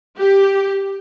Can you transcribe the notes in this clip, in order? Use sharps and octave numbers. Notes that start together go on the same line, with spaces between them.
G4